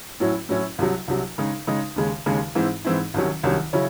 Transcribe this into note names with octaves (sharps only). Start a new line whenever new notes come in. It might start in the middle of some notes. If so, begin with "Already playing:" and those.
A2 F#3 C#4 E4
A2 F#3 C#4 E4
C2 C3 F#3
C2 C3 F#3
C#3 G#3 D#4
C#3 G#3 D#4
D#2 C#3 G#3
D#2 C#3 G#3
G#2 E3 C4 E4
G#2 E3 C4 E4
C2 C3 D#3 F#3 C#4
C2 C3 D#3 F#3 C#4
C#3 F#3 C#4 E4